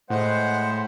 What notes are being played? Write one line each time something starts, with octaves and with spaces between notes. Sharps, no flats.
A2 G#3 C5 F#5